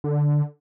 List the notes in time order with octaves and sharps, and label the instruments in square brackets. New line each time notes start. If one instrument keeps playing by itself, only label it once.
[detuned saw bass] D3